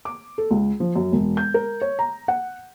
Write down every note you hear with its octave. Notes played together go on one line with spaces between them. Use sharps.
D6
A4
C#2
F3
F#2
E1
G6
A#4
C#5
A#5
F#5